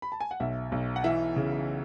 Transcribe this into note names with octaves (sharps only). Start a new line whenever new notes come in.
B5
A5
G#5
F#5
B1 E5
B1
F#5
E3 E5
C#3